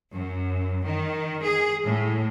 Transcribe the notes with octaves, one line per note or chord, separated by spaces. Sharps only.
F#2
D#3
G#4
A2